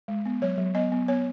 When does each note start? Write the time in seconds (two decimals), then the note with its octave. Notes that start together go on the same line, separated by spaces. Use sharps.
0.08 G#3
0.26 B3
0.42 F#3 C#5
0.58 F#3
0.75 B3 D#5
0.92 B3
1.08 B3 C#5